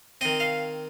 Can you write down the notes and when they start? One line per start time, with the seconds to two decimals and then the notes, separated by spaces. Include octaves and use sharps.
0.21 D#3 C4 D#5
0.40 F5